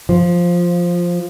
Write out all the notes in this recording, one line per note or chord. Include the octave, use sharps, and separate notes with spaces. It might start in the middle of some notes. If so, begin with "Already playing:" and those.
F3